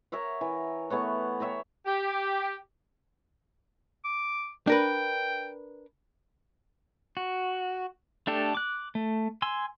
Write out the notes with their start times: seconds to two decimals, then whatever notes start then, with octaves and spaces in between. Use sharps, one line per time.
0.12 A#4 C#5 E5 F#5
0.41 E3
0.90 A3 B3 C#5 F#5
1.40 C#5 E5 G5 A#5
1.86 G4
4.05 D6
4.67 D4 A#4 B4 G5
7.17 F#4
8.27 A3 D4 G4 A4
8.55 D6 F#6
8.95 A3
9.42 G#5 C6 E6